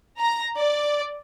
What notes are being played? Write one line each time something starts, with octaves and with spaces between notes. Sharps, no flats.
A#5
D5